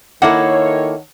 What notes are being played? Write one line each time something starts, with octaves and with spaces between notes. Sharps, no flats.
D#3 A#3 E4 A4 C#5 F#5